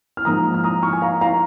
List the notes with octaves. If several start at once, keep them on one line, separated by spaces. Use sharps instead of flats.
F6
G#2 F3 A#3 A#5 D#6
F6
A#5 D#6
C#6 F6
G#5
F5 A#5
F5 A#5